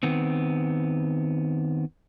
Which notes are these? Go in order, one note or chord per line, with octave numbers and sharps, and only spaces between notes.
D#3 B3 C4